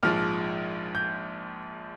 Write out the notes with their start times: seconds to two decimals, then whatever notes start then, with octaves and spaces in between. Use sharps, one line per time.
0.03 A#1 G#2 F3 F6
0.95 G6